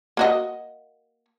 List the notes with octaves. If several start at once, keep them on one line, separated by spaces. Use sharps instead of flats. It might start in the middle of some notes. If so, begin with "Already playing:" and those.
A#3 F#4 D#5